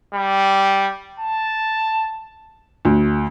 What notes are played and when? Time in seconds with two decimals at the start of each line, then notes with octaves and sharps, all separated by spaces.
0.14 G3
1.19 A5
2.85 D2